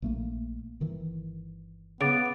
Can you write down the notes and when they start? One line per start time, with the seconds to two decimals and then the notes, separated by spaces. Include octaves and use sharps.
0.02 A#1 A3 A#3
0.80 G1 D#3 E3
2.01 C#3 B3 D6 A6 D7